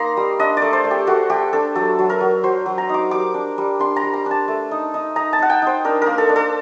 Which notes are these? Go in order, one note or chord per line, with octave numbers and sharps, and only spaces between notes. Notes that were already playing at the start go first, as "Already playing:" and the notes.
Already playing: A#3 D#4 A#5 C6
G3
D4 D#5
D5
A3
C5
A3
G4
A3 F#4
A3 G4
D4 A4
F#3 A4
F#3
A#4
F#3
F#3 C5
F#3
A#5
D#4 D6
G3 D6
D4
G3
D4 C6
A#5
G3
A#5
D4 A5
A3
D#4
D#4
D#4 A#5
A5
D#4 F#5
G5
D#4 C5
D4 A#4
A#4
A#3
A4
D4
A4